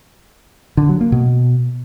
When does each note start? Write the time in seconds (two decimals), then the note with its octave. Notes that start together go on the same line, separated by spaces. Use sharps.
0.77 D3
0.89 F#3
1.01 A#3
1.12 B2